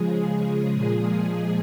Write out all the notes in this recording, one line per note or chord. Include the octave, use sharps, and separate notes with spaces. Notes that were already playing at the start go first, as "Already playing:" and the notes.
Already playing: C#3 F3 G#3 G#4
A#2 F3 G#3 G#4